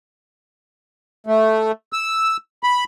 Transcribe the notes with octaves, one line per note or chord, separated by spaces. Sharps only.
A3
E6
B5